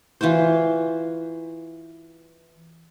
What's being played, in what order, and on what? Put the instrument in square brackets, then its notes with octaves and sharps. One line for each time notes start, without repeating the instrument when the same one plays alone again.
[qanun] E3 F4 F#4 C5